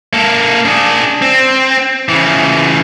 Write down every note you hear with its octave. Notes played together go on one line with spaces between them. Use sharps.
A#3 A4
D4 G#4
C4
C#3 E3